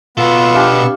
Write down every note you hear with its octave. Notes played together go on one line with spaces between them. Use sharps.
B2 B3 F4 A4 C#6 E6
D4 G4 F5